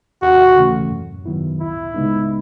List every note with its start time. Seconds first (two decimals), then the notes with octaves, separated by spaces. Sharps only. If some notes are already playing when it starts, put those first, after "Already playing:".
0.22 D#2 F#4
0.56 C#3 E3 A3 C#4
0.90 F#2
1.26 D#3 F#3 B3 E4
1.60 C#2 E4
1.94 C#3 G#3 B3 D#4